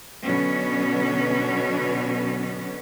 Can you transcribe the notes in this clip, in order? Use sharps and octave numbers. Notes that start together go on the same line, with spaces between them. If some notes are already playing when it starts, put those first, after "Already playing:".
B2 D3 F#3 B3 C#4